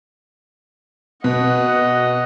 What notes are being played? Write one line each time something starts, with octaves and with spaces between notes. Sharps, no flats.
B2 D#5 F#5